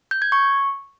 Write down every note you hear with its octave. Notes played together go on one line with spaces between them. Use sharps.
G6
G#6
C#6